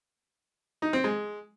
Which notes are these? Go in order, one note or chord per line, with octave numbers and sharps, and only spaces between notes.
D#4
C4
G#3